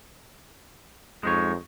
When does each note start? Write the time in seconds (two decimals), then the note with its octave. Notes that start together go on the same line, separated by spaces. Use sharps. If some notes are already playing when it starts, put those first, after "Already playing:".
1.23 F2 G#3 D#4 C#5